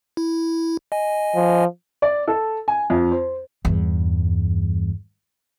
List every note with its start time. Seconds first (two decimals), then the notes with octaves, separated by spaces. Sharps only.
0.17 E4
0.92 D#5 G#5
1.35 F3
2.02 D5
2.28 A4
2.68 G#5
2.90 F2
3.12 C5
3.65 E2 G2